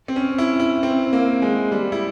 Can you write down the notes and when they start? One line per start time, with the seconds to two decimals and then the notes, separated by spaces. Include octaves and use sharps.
0.08 C4
0.16 C#4
0.38 E4
0.60 E4
0.83 C4
1.13 A#3
1.42 G#3
1.72 G3
1.92 E4